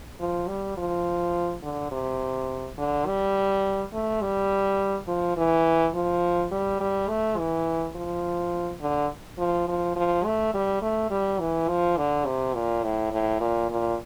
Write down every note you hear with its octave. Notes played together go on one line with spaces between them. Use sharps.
F3
G3
F3
D3
C3
D3
G3
A3
G3
F3
E3
F3
G3
G3
A3
E3
F3
D3
F3
F3
F3
A3
G3
A3
G3
E3
F3
D3
C3
A#2
A2
A2
A#2
A#2